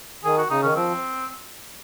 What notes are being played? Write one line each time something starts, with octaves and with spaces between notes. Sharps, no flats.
D#3 G#4
F#4
C#3 D#4
D#3 C#4
F3 C4